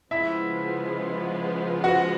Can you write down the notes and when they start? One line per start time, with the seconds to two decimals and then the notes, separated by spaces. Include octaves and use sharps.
0.11 C#3 F3 G#3 B3 E4 E5
1.84 F#4 F#5